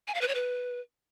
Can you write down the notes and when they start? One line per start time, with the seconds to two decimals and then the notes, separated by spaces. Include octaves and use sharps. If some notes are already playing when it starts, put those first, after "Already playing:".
0.08 G#5
0.14 F5
0.21 B4
0.28 C#5
0.35 B4